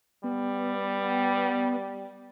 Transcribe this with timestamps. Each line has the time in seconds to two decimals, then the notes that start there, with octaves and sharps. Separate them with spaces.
0.24 G3 B3